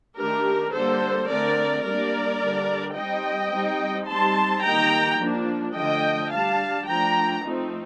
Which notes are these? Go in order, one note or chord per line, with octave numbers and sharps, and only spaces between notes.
D#3 A3 D4 G4 A#4
D3 G3 A#3 A4 C5
D3 A3 C4 A#4 D5
G3 A#3 D4 A#4 D5
D3 G3 D4
G3 C4 D#4 D#5 G5
G3 C4 D#4
G3 C4 D#4 A5 C6
D#3 G3 A#3 D#4 G5 A#5
F3 A#3 D4
D3 F3 A3 D#5 G5
G3 D4 F5 A5
F3 A3 D4 G5 A#5
F3 A3 C4 D#4